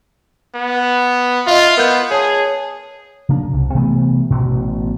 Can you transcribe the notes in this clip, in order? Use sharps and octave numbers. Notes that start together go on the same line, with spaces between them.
B3
F4 D#5 E5
B3 A#4 G6
G#4 C#5 A5
C#3 F#3 A#3 D4
C2
C3 E3 A3 B3
A1 B2